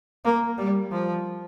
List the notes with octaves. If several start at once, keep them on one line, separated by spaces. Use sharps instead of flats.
A#3
G3
F3